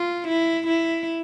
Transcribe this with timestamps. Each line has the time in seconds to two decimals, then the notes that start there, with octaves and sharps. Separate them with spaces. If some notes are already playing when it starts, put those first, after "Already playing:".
Already playing: F4
0.28 E4
0.67 E4